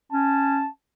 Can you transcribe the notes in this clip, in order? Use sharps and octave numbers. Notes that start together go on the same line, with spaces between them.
C#4 A5